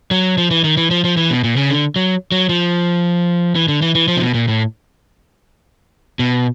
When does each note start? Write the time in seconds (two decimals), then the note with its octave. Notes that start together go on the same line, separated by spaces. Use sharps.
0.11 F#3
0.38 F3
0.51 E3
0.64 D#3
0.77 E3
0.91 F3
1.04 F3
1.17 E3
1.31 B2
1.44 A#2
1.57 C#3
1.70 D3
1.96 F#3
2.32 F#3
2.49 F3
3.55 E3
3.68 D3
3.82 E3
3.95 E3
4.08 F3
4.17 C3
4.21 B2
4.34 A#2
4.48 A2
6.19 B2